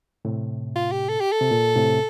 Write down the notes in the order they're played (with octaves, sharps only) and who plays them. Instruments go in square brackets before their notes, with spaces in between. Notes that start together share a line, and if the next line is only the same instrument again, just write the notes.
[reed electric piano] A2 C3
[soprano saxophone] F4
G4
A4
G4
A4
[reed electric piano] C3
A#2
A2 C3